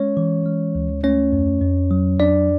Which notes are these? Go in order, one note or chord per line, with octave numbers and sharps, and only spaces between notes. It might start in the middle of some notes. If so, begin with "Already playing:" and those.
Already playing: G#3 C#4 C#5
E3
G#3
D2
A3 C#4 C#5
F2
F2
F#3
F2 D4 D5